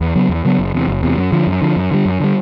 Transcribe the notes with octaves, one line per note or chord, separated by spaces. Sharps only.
E2
C#3 F#3 B3
E2
C#3 F#3 B3
F#1
E2 C3
F#1
E2 C3
F#2
D3 F3
F#2
D3 F3
F#2
D3 G3
F#2
D3 G3